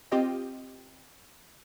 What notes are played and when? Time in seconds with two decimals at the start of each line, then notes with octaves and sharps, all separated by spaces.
0.12 C4 F4 G4 D#5 G5